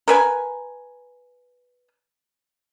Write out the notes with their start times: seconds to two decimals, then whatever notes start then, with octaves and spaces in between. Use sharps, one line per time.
0.08 A#4 B4 G#5